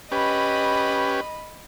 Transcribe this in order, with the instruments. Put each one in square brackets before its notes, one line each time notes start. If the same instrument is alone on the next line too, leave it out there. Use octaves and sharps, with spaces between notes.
[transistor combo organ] C#4 G4 B4 [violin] D#5 B5